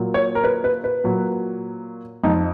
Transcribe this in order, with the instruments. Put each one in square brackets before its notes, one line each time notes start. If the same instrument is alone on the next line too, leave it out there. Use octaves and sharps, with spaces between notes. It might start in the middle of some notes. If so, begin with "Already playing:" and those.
Already playing: [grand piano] A#2 F#3
C#5
A#4
B4
B4
B4
A#2 F#3
F2 F3 D#4